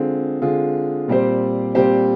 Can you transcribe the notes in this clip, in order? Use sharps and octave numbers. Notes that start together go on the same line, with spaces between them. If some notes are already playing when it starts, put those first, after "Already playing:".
Already playing: D3 G#3 C4 F4 G#4
D3 G#3 C4 F4 G#4
A#2 G3 C4 G4 C5
A#2 G3 C4 G4 C5